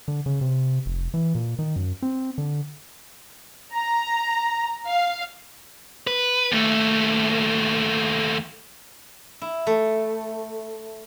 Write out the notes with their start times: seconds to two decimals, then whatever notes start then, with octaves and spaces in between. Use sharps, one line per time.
0.08 D3
0.26 C#3
0.41 C3
0.86 F1
1.14 E3
1.35 A#2
1.59 D#3
1.76 F#2
2.02 C4
2.38 D3
3.73 A#5
4.86 F5
6.07 B4
6.52 D#2 A3
9.41 E4
9.67 A3